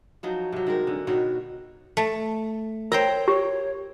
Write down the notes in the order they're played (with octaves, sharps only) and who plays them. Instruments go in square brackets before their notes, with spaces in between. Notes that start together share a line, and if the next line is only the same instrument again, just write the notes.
[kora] F3 F#3 D#4
C3 F#3
D#3 G#3 A#4
D3
B2 D#3 F#4 C#5
[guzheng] A3
[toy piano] A#4 [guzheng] C5 G5 A#5 [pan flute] C#5
[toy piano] G4 [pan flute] C#5